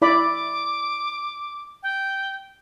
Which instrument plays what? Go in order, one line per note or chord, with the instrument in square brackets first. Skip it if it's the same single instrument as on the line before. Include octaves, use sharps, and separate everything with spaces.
[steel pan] E4 D5 B5 [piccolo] D6
[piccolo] G5